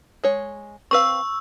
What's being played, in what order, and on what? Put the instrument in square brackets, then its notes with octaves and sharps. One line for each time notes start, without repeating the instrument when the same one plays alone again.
[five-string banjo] G#3 C#5
[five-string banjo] C4 B4 F5 [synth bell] C#6 E6